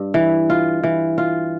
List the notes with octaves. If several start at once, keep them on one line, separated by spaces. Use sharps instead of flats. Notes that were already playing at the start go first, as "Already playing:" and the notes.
Already playing: G2
E3
F4
E3
F4